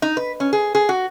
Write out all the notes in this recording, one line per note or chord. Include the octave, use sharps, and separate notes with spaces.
D#4
B4
C#4
G#4
G#4
F#4